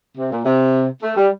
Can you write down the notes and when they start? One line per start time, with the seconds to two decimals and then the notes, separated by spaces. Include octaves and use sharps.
0.18 C3
0.32 A#2
0.45 C3
1.03 A3
1.16 G3